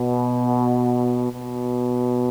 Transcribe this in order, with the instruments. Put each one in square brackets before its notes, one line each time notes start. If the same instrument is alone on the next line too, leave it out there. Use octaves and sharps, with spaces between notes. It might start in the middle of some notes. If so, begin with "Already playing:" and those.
Already playing: [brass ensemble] B2
B2